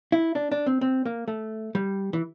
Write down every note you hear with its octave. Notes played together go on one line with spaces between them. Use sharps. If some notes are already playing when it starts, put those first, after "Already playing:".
E4
D4
D4
C4
C4
A#3
A3
G3
E3